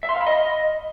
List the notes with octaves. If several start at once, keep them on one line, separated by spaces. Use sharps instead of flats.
E5
C6
F5
B5
D#5